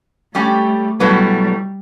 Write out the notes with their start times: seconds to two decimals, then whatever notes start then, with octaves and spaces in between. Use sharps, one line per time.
0.34 G3 A3 C#4 G4
1.00 B2 F#3 G3 A3 E4 B4